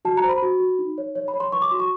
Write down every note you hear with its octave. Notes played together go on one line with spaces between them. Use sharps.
F#4 A5
A#5
C5
B5
F#4
F#4
D#4
C#5
C#5
B5
C#5
C6
B4 C#6
D6
F#4 C6
C#6